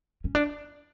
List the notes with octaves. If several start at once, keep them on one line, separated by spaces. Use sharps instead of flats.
C#4
D4